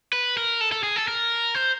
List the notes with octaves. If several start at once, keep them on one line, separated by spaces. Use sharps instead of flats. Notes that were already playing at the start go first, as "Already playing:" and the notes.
B4
A#4
A4
A4
G#4
A4
A#4
C5